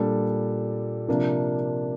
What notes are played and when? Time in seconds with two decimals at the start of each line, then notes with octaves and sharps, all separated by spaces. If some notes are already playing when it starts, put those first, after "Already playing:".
Already playing: A#2 G3 D4 A4
1.08 C3 F3 A#3 D4